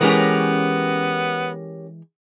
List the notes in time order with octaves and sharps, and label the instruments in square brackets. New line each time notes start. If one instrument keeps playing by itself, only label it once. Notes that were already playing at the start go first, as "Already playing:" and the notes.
[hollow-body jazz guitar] E3 G#3 [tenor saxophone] B3 [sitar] C#4 G4 A#4